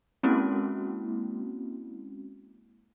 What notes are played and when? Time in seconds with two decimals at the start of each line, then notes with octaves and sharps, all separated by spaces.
0.23 G#3 A#3 C4 C#4 E4 F#4